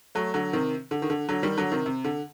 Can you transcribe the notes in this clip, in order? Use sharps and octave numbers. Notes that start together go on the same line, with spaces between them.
F#3 A3
D3 F#3
C3 D#3
D3
D#3
D3
D3 F#3
D#3 G3
D3 F#3
C3 D#3
C3
D3